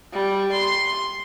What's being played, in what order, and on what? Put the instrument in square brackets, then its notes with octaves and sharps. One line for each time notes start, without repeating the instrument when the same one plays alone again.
[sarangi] G3
C6